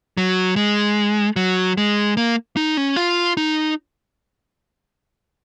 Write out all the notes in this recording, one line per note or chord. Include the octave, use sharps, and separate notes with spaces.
F#3
G#3
F#3
G#3
A#3
D#4
C#4
F4
D#4